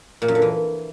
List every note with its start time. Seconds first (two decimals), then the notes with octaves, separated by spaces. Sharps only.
0.22 A#2
0.28 F#2
0.35 D3
0.42 E3